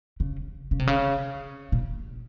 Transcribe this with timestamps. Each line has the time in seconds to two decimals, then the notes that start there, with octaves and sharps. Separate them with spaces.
0.20 C#3
0.71 C#3
0.79 C3
0.87 C#3
1.72 A#2